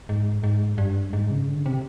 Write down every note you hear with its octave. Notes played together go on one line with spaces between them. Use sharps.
G#2
G#2
G2
G#2
C#3
D3
C3